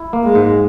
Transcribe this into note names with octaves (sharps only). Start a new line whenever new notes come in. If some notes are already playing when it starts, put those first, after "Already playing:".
Already playing: E4
A#3
G#3
G#2